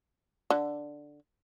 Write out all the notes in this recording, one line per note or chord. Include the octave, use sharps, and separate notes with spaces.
D3